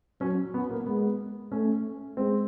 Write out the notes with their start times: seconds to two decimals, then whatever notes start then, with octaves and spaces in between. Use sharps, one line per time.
0.21 F#3 C#4
0.54 B3
0.71 A#3
0.87 G#3 B3
1.52 A3 C#4
2.17 G#3 C4